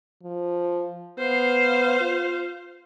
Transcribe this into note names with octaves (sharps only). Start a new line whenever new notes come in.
F3
B3 C5 F5
F4